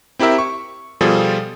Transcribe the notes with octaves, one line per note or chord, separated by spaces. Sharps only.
C4 E4 G4 A#4 E5
C#6
B2 F3 G3 F4 G#4 A4